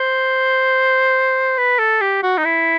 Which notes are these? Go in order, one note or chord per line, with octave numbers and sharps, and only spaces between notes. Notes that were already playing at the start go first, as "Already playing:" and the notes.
Already playing: C5
B4
A4
G4
F#4
D#4
E4